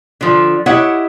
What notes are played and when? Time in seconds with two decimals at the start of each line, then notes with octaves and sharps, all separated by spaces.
0.21 D3 F3
0.66 E4 G4 C#5 D#5 E5 F#5